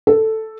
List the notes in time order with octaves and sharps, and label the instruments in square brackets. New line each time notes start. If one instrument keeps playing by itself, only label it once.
[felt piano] A4